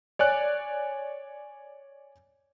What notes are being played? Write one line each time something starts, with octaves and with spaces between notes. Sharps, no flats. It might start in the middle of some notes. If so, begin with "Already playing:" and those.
C#5 D5 G#5 F#6